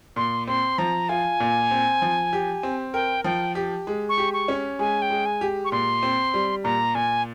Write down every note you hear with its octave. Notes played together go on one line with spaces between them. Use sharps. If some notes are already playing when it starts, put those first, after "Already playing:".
A#2 C6
C4 C6
F3 A#5
F4 G#5
A#2
C4
F3
G4
C4
A#4 G5
F3 G5
G4
G#3
C#6
G4
C#6
C#4
G#3 G#5
G5
G#3
G#5
G4
C#6
A#2 C6
C4
G3
A#2 A#5
A#2 G#5